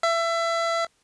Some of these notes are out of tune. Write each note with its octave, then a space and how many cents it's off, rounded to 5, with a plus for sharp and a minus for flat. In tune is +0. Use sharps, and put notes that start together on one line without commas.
E5 +25